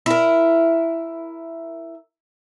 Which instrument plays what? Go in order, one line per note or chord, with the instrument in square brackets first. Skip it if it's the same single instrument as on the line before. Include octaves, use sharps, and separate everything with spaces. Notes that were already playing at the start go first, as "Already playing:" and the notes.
[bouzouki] E4 A#4